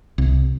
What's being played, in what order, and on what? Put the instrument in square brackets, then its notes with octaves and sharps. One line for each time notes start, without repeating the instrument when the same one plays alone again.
[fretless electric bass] C2